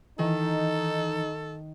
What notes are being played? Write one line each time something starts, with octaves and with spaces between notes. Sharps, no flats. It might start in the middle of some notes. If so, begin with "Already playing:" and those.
D#3 E3 D#4 A4